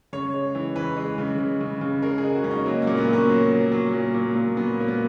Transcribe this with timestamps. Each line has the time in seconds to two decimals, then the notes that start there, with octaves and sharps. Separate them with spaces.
0.13 C#3 C#5
0.34 G#3
0.55 E3
0.75 E3 B4
0.97 G#3
1.18 C#3
1.39 C#3
1.61 C#3
1.81 C#3
2.02 G#3 A#4
2.18 G#4
2.23 G#3
2.35 F#4
2.44 C#3 C#4
2.51 D#4
2.66 F#3 A#3
2.82 A#3
2.87 A#2
2.97 B3
3.08 F#3 C#4
3.29 F#3
3.51 F#3
3.72 F#3
3.94 A#2
4.15 A#2
4.35 A#2
4.56 F#3 B3
4.78 A#2 A#3
4.88 B3